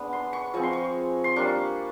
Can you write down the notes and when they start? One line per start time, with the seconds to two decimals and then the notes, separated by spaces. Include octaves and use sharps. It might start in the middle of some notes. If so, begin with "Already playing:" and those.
Already playing: G#3 B3 D4
0.13 C6
0.33 C#6
0.54 F3 G#3 C4 C#6
0.63 C6
0.73 C#6
1.24 C6
1.36 G3 A#3 D4 C#6